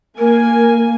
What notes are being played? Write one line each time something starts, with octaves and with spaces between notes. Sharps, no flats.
A#3 A#4 G#5